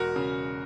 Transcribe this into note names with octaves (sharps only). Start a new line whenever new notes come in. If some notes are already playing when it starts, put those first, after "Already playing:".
Already playing: E1 F#4 A#4
C#3